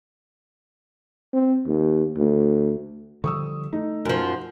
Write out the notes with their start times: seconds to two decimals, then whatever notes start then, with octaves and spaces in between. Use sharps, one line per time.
1.33 C4
1.66 D#2
2.17 D2
3.24 D3 F3 G3 C#6 D#6 E6
3.73 A3 D#4
4.05 F#2 F3